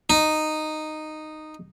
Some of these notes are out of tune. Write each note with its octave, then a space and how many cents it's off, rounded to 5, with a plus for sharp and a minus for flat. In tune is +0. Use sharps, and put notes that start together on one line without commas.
D#4 -10